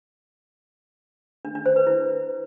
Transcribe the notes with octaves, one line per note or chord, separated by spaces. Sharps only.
D4
D4
C5
B4
E4